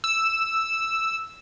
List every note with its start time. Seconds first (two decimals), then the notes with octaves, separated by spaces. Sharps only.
0.04 E6